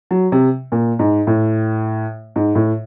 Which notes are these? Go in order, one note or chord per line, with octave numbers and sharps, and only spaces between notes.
F#3
C3
A#2
G#2
A2
G#2
A2